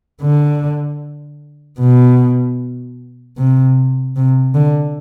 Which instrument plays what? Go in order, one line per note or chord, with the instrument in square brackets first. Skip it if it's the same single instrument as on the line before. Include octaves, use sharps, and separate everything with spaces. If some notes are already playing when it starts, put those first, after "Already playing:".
[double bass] D3
B2
C3
C3
D3